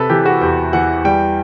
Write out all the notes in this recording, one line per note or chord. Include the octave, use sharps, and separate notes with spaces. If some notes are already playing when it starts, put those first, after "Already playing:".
Already playing: C3 A4 B4
E3 G4
F#4
E2 G4
E3 F#5
G3 G5